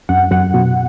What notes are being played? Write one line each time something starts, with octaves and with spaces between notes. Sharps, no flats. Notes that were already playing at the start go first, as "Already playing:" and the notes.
F#2 F#5
F#2 F#5
B2